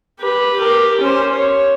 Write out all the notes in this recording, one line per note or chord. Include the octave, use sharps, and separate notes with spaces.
G4 B4
G4 A#4
C#4 C5
C#5